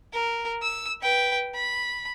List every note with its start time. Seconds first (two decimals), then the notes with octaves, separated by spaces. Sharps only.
0.13 A#4
0.62 E6
1.01 B4 G5
1.55 B5